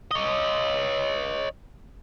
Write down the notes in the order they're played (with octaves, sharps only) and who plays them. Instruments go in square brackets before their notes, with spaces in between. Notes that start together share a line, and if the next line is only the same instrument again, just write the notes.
[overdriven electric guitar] C#5 D#5